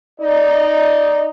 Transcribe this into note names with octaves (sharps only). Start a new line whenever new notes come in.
D#4 D5